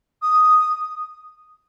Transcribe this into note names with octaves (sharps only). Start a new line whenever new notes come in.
D#6